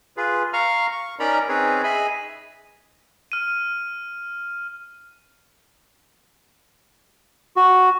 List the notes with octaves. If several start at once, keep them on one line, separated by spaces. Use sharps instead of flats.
F4 G#4 B4
F5 A#5 C#6 F6
C#6
C#4 D#4 A#4 D5 A#5 B5
C4 C#4 D#4 G#4 B4 C#5
G#4 D#5 E5 G#5 B5
F6 D#7
F#4